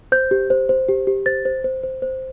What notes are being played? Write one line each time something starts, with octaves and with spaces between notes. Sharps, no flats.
C5 G6
G4
C5
C5
G4
G4
C5 A6
C5
C5
C5
C5